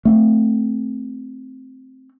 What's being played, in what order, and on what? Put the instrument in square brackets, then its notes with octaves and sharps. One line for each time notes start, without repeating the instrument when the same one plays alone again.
[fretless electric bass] A3 C4